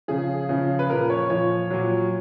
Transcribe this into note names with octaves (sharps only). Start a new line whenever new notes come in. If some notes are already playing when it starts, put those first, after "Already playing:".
C#3 F3 G#4
C#3 F3
B4
A#2 F3 A#4
C#5
A#2 F3 C#5
A#2 F#3